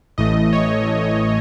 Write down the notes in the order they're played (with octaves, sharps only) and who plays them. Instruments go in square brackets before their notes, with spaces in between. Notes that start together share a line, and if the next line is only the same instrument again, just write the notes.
[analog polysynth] A1 A2 E3 A3 D#5
C#5
A1 A2 E3 A3